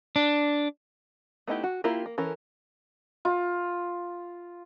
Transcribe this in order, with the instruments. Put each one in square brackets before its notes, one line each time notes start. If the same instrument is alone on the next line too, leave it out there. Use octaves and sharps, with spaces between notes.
[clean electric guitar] D4
[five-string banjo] A3 B3 D#4 E4 G4
F#4
A#3 E4 F4 G4 A#4
A#3
E3 C#4 A4 A#4
[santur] F4